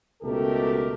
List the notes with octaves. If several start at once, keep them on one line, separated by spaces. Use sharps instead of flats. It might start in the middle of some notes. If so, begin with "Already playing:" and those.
C#2 B2 A3 G4 A4 A#4